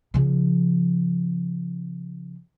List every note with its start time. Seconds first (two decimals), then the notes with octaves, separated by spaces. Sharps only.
0.14 C#3 F3